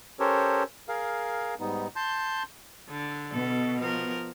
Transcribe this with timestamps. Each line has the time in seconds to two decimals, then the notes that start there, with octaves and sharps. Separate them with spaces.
0.20 C#4 G4 A4 A#4 C5 C#5
0.88 G#4 A#4 F5
1.60 G#2 G3 B3 D#4
1.96 A5 C6 G6
2.89 D3 D4
3.33 B2 A4
3.79 F3 A#4